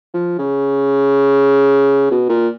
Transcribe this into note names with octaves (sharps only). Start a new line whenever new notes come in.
F3
C#3
B2
A#2